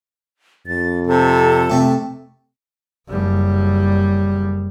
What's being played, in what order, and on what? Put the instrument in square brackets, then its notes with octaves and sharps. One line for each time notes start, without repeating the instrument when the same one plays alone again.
[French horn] F2 [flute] A6
[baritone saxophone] C3 [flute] A4
[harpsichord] C3 A3
[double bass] F#1 G3